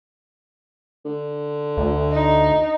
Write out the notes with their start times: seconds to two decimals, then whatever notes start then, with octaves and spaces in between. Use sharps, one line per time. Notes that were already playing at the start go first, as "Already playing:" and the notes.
1.05 D3
1.77 D2
2.12 D#4